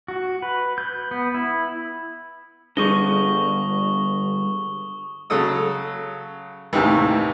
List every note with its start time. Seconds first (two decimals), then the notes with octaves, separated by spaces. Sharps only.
0.08 F#4
0.42 B4
0.78 G6
1.11 B3
1.34 E4
2.77 G2 D3 G3 G#4 C#6 D#6 A#6 G7
5.30 C#3 F#3 A4 D#6 E6
6.73 D#2 A2 C3 D#3 E3